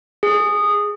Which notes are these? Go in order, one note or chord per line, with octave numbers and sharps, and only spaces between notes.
G#4